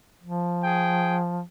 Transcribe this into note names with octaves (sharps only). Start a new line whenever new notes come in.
F3
G#4 G5